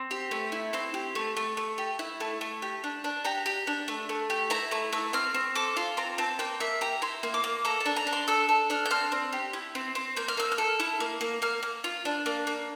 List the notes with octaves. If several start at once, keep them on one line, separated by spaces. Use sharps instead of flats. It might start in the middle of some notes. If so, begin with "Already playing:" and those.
Already playing: C4
G4
A3
E4
C4 C6
G4
A3
A3
A3
G4
E4
A3
A3
G4
D4
D4
G4 A#5
G4
D4
A3
A3
G4
E4 A#5
A3 A#5
A3 E6
C4 F6
C4
A4 D6
F4 C6
C4 A#5
C4 A5
A#3 G5
A#3 E5
G4 A#5
E4 C6
A#3
D6
A#3
A4 A#5
A5
D4
A#5
D4
C6
A4 E6
A4
D4 F6
G6
C4 F6
C4
G4
E4
C4
C4
A#3 G6
F6
A#3 E6
F6
A4
E4
A#3
A#3
A#3 F6
A#3
F4
D4
A#3
A#3